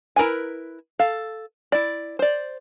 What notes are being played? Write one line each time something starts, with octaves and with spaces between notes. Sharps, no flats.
E4 A#4 B4 G#5
A4 F5
E4 D5
C5 D5